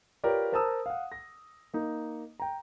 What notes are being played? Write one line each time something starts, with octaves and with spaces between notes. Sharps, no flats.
F4 G4 A#4 B4 C#5 D5
A#4 C5 A5 A#5 D#6 E6
F5 F#5
A#6
A#3 D#4
G5 A#5